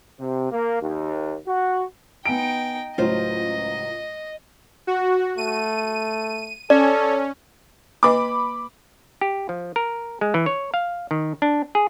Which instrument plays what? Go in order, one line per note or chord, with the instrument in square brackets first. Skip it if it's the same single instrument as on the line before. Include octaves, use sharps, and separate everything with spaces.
[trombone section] C3
A#3
D#2
F#4
[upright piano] B3 G#5 D7 [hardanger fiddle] D#4 G5
[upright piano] C#2 A2 F#3 [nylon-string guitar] F4 C5 [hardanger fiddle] D#5
[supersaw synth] F#4
[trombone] A3 [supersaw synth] D#7
[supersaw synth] C#4 [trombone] A4 [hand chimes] D5
[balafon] A#3 B4 D#5 [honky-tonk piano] B5 D6
[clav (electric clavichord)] G4
F3
A#4
G#3
E3
C#5
F5
D#3
D4
G#4